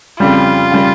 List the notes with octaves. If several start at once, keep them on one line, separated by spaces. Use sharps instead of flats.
F2 C#3 G3 F4
C#3 G3